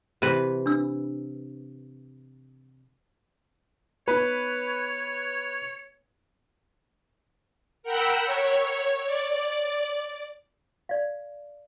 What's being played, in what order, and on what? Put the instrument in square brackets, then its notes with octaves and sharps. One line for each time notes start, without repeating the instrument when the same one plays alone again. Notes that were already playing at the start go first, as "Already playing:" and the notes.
[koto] C3 E3 B4
[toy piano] D4 E6
[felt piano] B3 D#4 [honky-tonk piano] B4 [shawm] C#5
[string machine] A#4 F#5 G5 B5 E6
C#5
D5
[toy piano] D5 F5